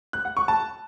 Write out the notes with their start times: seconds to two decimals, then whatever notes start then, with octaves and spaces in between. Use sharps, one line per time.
0.13 F#6
0.25 F#5
0.37 C#6
0.48 A5